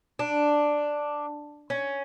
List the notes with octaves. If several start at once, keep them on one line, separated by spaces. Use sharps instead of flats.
D4
C#4